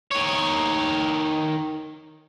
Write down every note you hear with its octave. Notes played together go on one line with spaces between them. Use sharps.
D#3 C#5